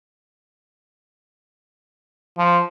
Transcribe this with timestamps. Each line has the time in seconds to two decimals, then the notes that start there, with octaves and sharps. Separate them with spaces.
2.38 F3